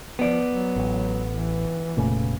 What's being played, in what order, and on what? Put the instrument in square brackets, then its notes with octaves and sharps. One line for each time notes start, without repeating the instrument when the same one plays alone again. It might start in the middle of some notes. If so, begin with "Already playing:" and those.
[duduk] F3 [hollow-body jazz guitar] B3 D5
[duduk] F#3
[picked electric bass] A1
[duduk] E3
[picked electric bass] F1 C#3 [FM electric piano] A#2 A3